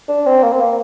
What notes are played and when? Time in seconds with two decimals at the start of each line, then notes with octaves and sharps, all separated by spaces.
0.09 D4
0.26 C4
0.43 A#3
0.53 C4
0.61 A#3